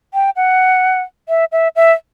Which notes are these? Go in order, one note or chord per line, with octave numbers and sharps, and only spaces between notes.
G5
F#5
E5
E5
E5